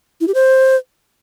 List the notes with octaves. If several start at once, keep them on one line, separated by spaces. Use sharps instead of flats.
E4
G4
C5